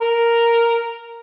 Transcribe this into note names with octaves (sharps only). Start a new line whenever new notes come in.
A#4